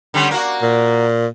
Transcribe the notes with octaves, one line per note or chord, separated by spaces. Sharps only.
D3 G3 C#4
A#3 F#4
A#2